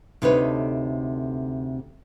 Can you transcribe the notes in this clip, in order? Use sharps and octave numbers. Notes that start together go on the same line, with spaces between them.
D2 C3 D#4 A4 B4 C#5